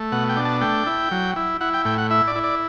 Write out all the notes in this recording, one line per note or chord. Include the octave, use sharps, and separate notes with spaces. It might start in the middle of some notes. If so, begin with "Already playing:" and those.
Already playing: A3
B2 F#5
G5
D4
A5
A3 G5
E4
F#3
E4
E4 F#5
G5
A2 G5
F#5
E4 E5
D5
E4
D5